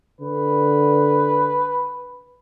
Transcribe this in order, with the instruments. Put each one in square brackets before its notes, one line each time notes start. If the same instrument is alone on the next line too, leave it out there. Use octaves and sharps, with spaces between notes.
[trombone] D3 [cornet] B4